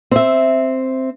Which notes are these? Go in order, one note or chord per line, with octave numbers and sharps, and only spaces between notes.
C4 E5